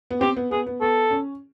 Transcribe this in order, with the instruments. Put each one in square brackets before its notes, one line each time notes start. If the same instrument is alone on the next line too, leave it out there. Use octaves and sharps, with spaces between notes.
[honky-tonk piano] B3
[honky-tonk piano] C4 [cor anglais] G4
[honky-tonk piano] B3
[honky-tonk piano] B3 [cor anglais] G#4
[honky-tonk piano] B3
[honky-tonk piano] B3 [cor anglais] A4
[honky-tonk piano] C#4